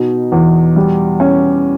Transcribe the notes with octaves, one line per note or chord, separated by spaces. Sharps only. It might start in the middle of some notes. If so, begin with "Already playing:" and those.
Already playing: B2 D#4
E2
G3
C#4